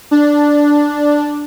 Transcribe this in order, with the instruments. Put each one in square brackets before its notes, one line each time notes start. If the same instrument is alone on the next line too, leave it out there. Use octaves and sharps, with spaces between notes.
[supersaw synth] D4